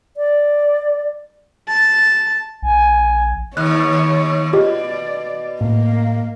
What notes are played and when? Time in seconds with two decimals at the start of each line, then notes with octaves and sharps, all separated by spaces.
0.17 D5
1.68 A5
2.62 A#1 G#5
3.57 D#2 C#5 F#6
4.53 B2 F4 G4 D5 D#5
5.61 A2 A#3